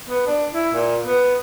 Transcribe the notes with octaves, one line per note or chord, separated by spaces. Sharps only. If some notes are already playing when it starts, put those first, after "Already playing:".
B3
D4
E4
A#2
B3